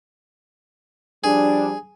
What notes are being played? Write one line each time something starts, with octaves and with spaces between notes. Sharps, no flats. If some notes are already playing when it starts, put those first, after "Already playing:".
F3 G3 D4 G#4